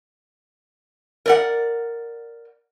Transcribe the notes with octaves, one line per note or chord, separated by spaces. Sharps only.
A#4 D5 F#5